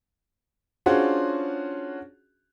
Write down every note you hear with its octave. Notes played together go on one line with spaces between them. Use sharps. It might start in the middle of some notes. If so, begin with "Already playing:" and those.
C#4 D4 F4 F#4 G#4 C5